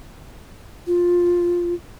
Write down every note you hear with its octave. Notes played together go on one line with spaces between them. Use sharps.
F4